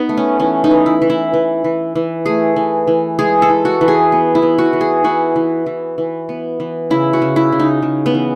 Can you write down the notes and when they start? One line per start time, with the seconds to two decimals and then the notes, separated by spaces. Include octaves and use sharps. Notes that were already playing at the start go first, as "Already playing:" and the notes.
Already playing: B3 D#4
0.09 A3
0.17 C#4
0.39 E3 C#4
0.64 D#4
0.71 E3
0.86 E4
1.02 E3
1.10 E4
1.33 E3
1.64 E3
1.95 E3
2.26 A3 G#4
2.56 E3
2.87 E3
3.19 G#3 G#4
3.42 A4
3.50 E3
3.65 F#4
3.81 E3
3.88 G#4
4.12 B3
4.35 E4
4.42 B3
4.58 F#4
4.73 E3
4.81 G#4
5.04 E3 F#4
5.36 E3
5.66 E3
5.98 E3
6.29 B3
6.60 E3
6.90 C#3 E4
7.13 F#4
7.22 C#3
7.36 E4
7.52 C#3
7.59 D#4
7.82 C#3
8.06 B3
8.14 E3